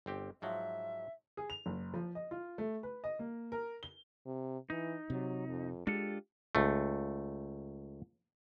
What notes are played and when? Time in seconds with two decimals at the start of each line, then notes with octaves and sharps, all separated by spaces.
0.06 G1 C4 G4
0.42 G#2 F3 F#3 E5
1.37 G#4
1.50 F7
1.66 F#1
1.94 F3
2.15 D#5
2.31 F4
2.58 A3
2.83 B4
3.04 D#5
3.19 A#3
3.52 A#4
3.83 G7
4.26 C3
4.70 E3 D#4
5.10 C3 F#3
5.48 F2
5.87 G#3 D4 F4 G4 A4
6.55 C#2 A3